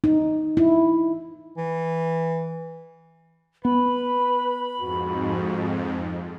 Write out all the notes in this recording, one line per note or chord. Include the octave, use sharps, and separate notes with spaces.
D#4
E4
E3
B3 B4 B5
F2 G#2 F#4